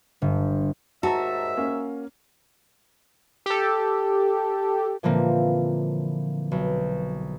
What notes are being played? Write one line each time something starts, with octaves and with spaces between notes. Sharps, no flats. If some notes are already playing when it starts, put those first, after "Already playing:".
G1
D#2 G#2 F#4 E5 A5 A#5
A#3 C#4
G4 A4
A#2 D3 E3 F3 A#3 C4
B1